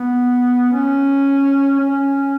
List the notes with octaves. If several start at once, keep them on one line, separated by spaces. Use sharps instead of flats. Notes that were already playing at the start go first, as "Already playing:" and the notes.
Already playing: B3
C#4
C#4